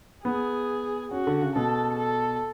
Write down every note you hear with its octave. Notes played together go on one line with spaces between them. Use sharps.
B3 G#4
C#4 F#4
D3
C#3
B2 A4
A4